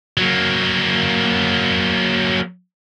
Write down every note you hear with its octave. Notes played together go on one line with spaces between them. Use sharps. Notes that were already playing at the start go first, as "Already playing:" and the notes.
F#3 A#3